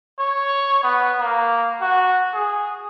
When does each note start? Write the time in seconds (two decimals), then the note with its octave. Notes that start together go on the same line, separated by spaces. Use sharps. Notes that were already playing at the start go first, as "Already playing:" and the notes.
0.19 C#5
0.83 B3
1.19 A#3
1.81 F#4
2.33 G#4